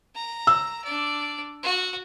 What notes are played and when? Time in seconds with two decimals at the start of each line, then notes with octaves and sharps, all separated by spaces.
0.15 A#5
0.47 E6
0.84 D4 D5
1.63 F#4